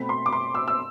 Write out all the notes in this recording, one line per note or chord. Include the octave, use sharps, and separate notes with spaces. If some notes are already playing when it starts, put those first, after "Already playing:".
Already playing: B2 A3 C4 B5
C6
D6
C6
E6
E6